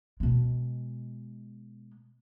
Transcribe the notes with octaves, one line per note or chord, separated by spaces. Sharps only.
B2 G#3